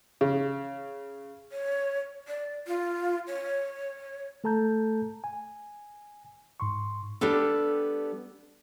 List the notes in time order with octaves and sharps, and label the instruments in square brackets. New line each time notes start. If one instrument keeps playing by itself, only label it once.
[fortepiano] C#3
[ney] C#5
D5
F4
C#5
[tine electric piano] A3 A4 A5 A#5 G6
G#5
G#2 C6 C#6
[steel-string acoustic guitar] G3 B3 D4 G4 A4